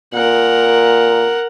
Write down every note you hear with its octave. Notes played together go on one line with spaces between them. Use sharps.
A#2 A#4 F#5